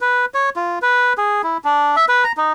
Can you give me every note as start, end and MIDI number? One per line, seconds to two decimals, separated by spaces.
0.01 0.26 71
0.34 0.50 73
0.56 0.79 65
0.82 1.13 71
1.18 1.42 68
1.44 1.57 64
1.64 1.96 62
1.96 2.05 76
2.09 2.24 71
2.24 2.32 82
2.37 2.53 63